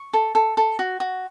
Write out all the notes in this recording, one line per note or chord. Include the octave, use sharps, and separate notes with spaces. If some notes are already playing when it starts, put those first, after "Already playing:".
Already playing: C#6
A4
A4
A4
F#4
F#4